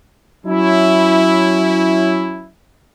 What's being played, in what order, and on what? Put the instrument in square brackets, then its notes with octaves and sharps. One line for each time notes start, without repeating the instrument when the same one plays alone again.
[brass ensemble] F#3 C#4 E4